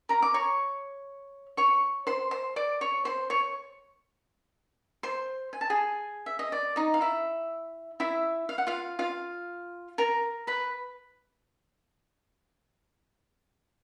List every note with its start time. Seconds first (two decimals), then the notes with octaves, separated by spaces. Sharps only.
0.09 A#4 A#5
0.22 D6
0.34 C#5 C#6
1.57 C#5 C#6
2.07 C5 C6
2.31 C5 C6
2.56 D5 D6
2.81 C#5 C#6
3.05 C5 C6
3.30 C#5 C#6
5.03 C5 C6
5.53 G#5
5.61 A5
5.70 G#4 G#5
6.26 E5
6.39 D#5
6.52 D5
6.76 D#4 D#5
6.94 F5
7.01 E4 E5
8.00 E4 E5
8.49 F5
8.58 F#5
8.67 F4 F5
8.99 F4 F5
9.98 A#4 A#5
10.47 B4 B5